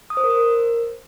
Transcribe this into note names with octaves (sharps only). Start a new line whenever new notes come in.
D#6
C5
A#4
C5
A#4